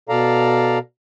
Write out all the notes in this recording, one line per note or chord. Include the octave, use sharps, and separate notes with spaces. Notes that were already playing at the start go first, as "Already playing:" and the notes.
B2 A4 D5 F5 A#5